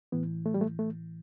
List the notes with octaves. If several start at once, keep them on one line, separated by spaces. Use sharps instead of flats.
A2 E3 B3
A3
G3
A3
A3